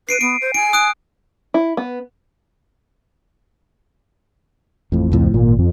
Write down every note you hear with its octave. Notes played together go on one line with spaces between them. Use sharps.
B4 C7 D7 D#7
B3 D7
C5
G#5 D7
D#6 F#6 D7
E4
B3
A1 F2 A2
C#2 A2 F3
G#1 A#2
F2